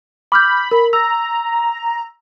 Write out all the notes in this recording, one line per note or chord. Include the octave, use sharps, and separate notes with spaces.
B5 D6 F6 G6
A#4
A#5 E6 A#6